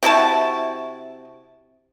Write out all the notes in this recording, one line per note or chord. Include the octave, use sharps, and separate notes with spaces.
C3 E4 F#4 A5